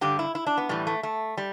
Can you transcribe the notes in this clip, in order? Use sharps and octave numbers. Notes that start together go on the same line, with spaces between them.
G2 D3 G4
E4
E4
D4
B3
A2 E3 G3
A3
A3
G3